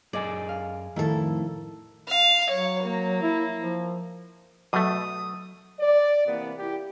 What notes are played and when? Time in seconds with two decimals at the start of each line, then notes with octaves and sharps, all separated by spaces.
0.13 F#2 G#4 D5 D#5 G#5
0.49 F5
0.96 F2 A2 D#3 E4 A4
2.08 F5
2.50 F#3 C#5
2.84 A#3
3.22 E4
3.60 F3
4.73 B2 F#3 A3 D#6
5.79 D5
6.26 C3 E3 A#3 B3
6.59 E4 G4